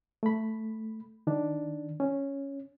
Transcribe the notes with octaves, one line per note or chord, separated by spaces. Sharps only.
A3 B5
D#3 D4
C#4